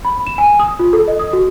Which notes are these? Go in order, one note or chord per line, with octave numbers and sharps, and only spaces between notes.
B5
E7
G#5
D#6
F4
A4
D#5
D#6
F#4